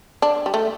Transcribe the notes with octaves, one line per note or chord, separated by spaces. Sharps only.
D4
G3
A3